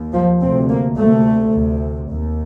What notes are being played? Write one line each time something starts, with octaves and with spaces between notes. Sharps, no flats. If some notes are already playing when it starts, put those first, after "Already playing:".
Already playing: D#2
F3
D2 C3 C4
A#3
D2 C3 A3
D2 C3
D#2